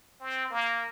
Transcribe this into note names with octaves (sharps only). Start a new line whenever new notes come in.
C4
A#3